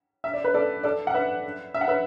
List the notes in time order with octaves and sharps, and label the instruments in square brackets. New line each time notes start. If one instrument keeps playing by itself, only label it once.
[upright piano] E5
D5
B4
A4 D5
A4 D5
F#5
B4 E5
E5
F#5
B4 E5